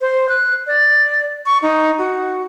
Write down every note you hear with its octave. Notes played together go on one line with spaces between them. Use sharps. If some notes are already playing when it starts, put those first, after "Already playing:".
C5
F#6
D5
C#6
D#4
F#4